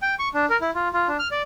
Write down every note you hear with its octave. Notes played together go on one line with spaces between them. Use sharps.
G5
C#6
D4
A#4
E4
F4
F4
D4
F6
D5